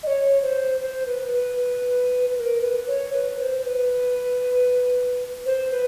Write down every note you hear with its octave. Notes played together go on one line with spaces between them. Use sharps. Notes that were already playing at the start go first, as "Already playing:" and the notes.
D#5
C#5
C5
C5
B4
B4
B4
A#4
B4
C#5
B4
C#5
C5
B4
C5
B4